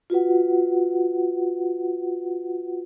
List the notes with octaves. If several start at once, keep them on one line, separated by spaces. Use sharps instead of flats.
F4 F#4 B4 F#5